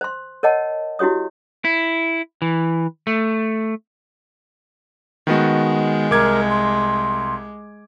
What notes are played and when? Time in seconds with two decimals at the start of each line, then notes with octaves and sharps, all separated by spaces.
0.01 C5 C6
0.43 A#4 C#5 D#5 F#5 A5
0.99 E4 F#4 G4 C#5 D#6
1.65 E4
2.42 E3
3.07 A3
5.27 D#3 G#3 B3 F#4
6.11 C2 A#4 D6 G#6
6.50 C6